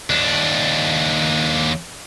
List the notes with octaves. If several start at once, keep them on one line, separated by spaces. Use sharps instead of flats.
D#2 D4